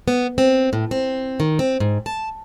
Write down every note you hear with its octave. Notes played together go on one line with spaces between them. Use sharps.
B3
C4
A2
C4
D#3
C4
G#2
A5